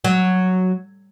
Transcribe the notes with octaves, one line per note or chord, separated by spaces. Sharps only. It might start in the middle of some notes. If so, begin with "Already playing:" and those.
F#3